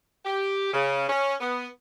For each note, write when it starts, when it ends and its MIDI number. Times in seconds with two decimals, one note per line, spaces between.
0.25 0.71 67
0.73 1.05 49
1.09 1.34 61
1.40 1.67 59